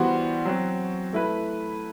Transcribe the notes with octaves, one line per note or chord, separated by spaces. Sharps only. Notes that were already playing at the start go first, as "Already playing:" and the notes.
Already playing: E3 G3 B3 F#4 C5
F#3 C4 F#4
A3 E4 B4